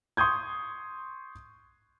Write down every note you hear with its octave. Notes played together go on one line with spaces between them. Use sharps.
C6 C#6 D#6 G6 G#6